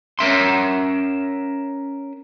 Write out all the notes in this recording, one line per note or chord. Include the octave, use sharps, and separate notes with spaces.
C#4 A#4 E5 C6